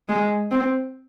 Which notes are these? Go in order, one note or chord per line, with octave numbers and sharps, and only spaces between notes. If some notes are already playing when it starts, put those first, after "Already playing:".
G#3
C4